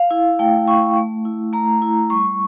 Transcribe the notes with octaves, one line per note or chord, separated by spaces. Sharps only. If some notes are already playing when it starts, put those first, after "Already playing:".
Already playing: F5
E4
A3 G5
E4 C#6
A3
E4
A3 A#5
E4
G3 C#6